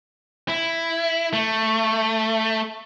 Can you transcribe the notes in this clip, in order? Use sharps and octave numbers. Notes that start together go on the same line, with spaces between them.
E4
A3